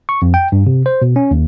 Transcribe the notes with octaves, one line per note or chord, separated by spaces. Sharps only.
C#6
F2
G5
G2
C3
C5
B2
C#4
D#2